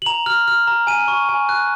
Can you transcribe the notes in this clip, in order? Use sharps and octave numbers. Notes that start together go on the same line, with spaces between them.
F#7
A#5 F7
F6
F6
A#5
G#5 D#7
C#6
G#5
F#6